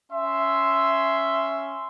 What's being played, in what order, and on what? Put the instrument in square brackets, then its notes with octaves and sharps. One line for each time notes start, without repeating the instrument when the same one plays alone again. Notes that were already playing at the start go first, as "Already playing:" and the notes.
[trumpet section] C#4 E5 C6